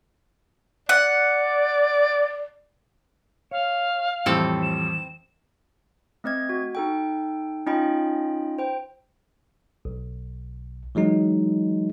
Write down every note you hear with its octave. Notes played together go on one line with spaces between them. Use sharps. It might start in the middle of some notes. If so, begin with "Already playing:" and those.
D5 F#5
C#5 F5
F2 A2 E3 G3 C4 A4
E7
A3 C4 D#5 G#6
F#4
D#4 A4 G5
C#4 D#4 F4 D#5 G5 B5
C5 G5
B1
E3 F#3 G#3 D#4